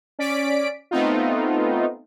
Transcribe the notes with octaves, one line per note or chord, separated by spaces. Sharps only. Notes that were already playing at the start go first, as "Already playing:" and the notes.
C#4 D5 B6 D7
A3 B3 C4 D#4 F4